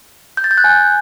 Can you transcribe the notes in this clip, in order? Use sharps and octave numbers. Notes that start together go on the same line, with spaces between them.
G6
A6
G6
F#6
G#5